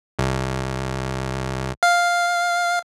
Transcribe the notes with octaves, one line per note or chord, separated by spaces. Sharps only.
C2
F5